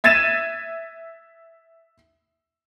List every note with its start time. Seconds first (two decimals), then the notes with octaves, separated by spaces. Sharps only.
0.04 E5 G#6 A6 D#7 E7